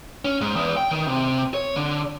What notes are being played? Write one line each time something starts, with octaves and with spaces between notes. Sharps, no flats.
C#4
G#2
E2
G5
D#3
C3
C#5
D3